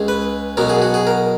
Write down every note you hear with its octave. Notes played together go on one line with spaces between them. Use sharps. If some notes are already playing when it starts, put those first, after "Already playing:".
Already playing: C#2 C#3 G#3
B4
B1 B2 F#3 A#4
G#4
F#4
G#4
A#4